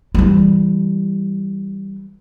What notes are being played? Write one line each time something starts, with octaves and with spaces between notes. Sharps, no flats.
E3 G3